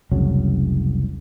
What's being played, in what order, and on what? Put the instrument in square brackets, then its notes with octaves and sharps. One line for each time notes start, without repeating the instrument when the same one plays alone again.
[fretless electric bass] F1 C2 C#3 F#3